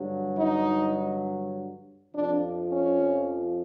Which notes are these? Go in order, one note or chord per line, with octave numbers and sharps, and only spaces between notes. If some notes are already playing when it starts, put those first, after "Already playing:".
Already playing: G2 D3 F#3
D#4
F2 C3 F3 D4
C#4